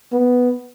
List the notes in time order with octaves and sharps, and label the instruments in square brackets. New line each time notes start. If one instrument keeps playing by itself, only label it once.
[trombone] B3